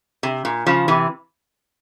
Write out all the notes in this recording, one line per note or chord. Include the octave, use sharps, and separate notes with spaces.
C3
A#2
C#3 F3
C3 E3